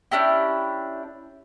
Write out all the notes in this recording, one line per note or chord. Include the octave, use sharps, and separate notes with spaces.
C#4 D4 E4 G4